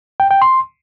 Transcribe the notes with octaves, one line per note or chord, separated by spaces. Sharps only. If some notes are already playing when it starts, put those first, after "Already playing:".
G5
G5
C6